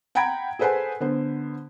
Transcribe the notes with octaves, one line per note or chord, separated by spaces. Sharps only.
F#5 G5 A#5 B5 G#6 D7
G#4 A4 B4 C5 F#5 G#5
D3 B3 C5